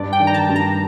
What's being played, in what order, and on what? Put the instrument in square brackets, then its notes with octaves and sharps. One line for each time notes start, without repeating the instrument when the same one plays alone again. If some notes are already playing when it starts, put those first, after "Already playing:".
Already playing: [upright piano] G2 [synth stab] D5
[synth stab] G5
[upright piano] D#3
[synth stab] A#5
A5
[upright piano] G2
[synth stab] A#5